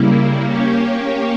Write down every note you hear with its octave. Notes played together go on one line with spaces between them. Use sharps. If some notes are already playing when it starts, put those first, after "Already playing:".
Already playing: C#3 G3 A#3 E4
A#3 C#4 G4 C#5